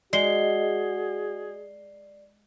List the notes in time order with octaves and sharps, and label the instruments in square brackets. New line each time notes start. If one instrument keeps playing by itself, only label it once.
[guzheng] G#3 [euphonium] F#4 [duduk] G#4 [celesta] D5 C7 G7